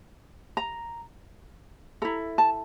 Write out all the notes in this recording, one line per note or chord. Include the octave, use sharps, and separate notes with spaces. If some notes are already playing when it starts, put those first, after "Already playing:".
A#5
E4 A4 A#5
A5